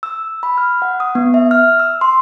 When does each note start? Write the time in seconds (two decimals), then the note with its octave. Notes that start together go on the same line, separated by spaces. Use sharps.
0.03 E6
0.43 B5
0.58 F6
0.82 F#5
1.00 D#6
1.15 B3
1.34 E5
1.51 F6
1.80 E6
2.01 C6